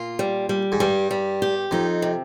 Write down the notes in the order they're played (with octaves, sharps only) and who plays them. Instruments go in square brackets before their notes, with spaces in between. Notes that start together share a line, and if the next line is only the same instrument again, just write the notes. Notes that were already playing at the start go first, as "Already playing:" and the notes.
Already playing: [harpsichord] A#2 [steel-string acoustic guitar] F4
[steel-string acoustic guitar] G3
G3
[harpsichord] G#2
[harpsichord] G2 [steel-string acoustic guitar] G3
[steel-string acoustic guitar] G3
G4
[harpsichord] F2 [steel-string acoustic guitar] D#4
[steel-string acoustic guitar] C3